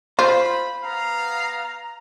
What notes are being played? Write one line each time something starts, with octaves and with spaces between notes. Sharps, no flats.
F4 C5 B5
B3 F5 A#5